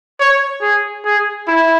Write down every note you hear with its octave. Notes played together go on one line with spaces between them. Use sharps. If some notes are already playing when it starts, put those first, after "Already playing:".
C#5
G#4
G#4
E4